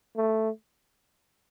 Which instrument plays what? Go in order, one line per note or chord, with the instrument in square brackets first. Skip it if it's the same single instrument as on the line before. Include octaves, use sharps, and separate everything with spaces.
[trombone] A3